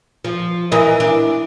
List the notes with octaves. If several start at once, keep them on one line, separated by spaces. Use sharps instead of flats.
F3
E3 A#4 D#5
D4